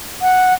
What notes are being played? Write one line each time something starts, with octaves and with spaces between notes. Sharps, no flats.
F#5